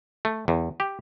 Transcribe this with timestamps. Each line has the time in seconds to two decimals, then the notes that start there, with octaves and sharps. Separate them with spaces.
0.25 A3
0.48 E2
0.80 G4